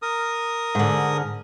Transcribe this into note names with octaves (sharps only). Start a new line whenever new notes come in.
A#4 D#6
G#2 D3